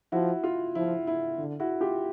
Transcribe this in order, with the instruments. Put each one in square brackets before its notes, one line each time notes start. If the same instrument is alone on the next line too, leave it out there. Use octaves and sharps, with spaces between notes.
[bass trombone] F3 [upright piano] E4 F#4
[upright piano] F4
[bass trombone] F3 [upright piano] E4
[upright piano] E4
[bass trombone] D3
[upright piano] E4 F#4
F4 G4